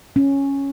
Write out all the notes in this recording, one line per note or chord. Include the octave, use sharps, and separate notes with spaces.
C#4